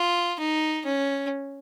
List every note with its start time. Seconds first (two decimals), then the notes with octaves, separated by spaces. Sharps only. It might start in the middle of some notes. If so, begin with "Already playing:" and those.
Already playing: F4
0.39 D#4
0.86 C#4